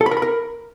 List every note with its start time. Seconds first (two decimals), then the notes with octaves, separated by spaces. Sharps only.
0.01 A4
0.06 B5
0.11 A#4
0.17 B5
0.22 A#4